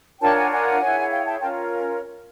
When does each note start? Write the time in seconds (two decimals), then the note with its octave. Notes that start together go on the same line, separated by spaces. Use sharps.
0.21 D4 F4 A#4 C#5 G5 A5
0.36 F#5 G#5
0.51 F#5 G#5
0.81 E4 G#4 C#5
1.00 F#5
1.10 F5 G5
1.25 G5 A5
1.40 C#4 F4 A#4 G5 A5